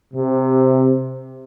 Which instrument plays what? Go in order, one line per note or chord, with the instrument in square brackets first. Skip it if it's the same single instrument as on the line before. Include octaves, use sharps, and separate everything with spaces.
[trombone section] C3